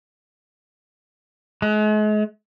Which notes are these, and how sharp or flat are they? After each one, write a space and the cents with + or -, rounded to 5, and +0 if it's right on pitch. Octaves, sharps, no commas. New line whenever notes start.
G#3 +40